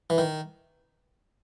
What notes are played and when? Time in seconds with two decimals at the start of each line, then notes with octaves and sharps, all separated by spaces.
0.10 E3
0.18 D#3